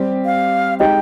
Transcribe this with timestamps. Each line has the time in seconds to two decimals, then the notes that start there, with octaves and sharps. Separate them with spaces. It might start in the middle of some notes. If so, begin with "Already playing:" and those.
Already playing: G3 C4 G4
0.25 F5
0.80 G#3 D#4 G4 G5